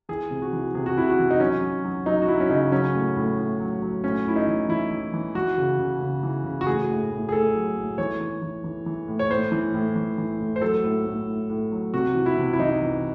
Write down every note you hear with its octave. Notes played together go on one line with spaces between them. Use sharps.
E3 G#4
C3
F#4
E3
C3 G#4
F#4
C3 E4
F#4
E3
D#4
F#3 C#4
F#3
F#3
F#3 D#4
F#4
F#3 E4
C#4
C#3 D#4
F#3 C#4
A2
A2
A2
F#3
F#3
A2 C#4
A2 E4
D#4
E3
E3 E4
E3
E3
E3 F#4
C#3
C#3
C#3
E3
C#3
F#4
A2 G#4
A2
A2
G#4
A2 A4
F#3
A2
E3 C#5
E3
E3
E3
E3
A2
C#5
A2 C5
E3
A2
E3
E3
A2
C5
F#3 A4
A2
A2
A2
A2
F#3
C3 F#4
E3
E4
C3
E4
E3 D#4
E3